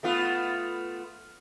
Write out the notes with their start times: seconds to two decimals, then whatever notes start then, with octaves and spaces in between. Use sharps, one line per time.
0.03 A3 B3 F4